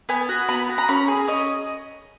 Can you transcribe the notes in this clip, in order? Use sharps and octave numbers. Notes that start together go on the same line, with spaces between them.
B3 G#5
F#4
B3 B5
F#4
A#5
C#4 B5
G#4
C#4 D#5